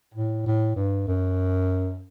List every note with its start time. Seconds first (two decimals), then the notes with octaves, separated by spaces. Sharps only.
0.14 A2
0.46 A2
0.76 G2
1.08 F#2